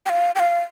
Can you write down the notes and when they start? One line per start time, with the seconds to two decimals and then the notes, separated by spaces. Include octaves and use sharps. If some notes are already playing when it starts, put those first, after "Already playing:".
0.06 G5
0.09 F5
0.35 G5
0.40 F5